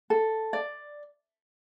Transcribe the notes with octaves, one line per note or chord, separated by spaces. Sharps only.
A4
D5